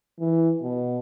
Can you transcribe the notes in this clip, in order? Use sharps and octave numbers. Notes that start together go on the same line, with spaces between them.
E3
B2